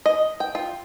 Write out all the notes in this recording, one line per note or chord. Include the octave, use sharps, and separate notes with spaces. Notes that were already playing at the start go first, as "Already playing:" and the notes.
D#5
G5
F4